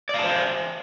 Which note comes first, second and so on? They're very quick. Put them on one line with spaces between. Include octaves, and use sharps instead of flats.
D5 F5 A5 C5 E5